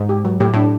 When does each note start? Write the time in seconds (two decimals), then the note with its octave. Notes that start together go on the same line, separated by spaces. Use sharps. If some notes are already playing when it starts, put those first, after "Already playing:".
Already playing: G#2
0.09 G4
0.25 F#3
0.40 A2 G4
0.54 A2 D4